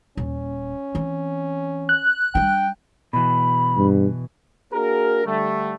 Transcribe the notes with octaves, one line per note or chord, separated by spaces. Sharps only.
D#1 C#4
E3 C4
F#6
G3 D4 G5
B2 E3 B5
G2
A#3 D4 F#4 G#4 A#4
D3 G3 A3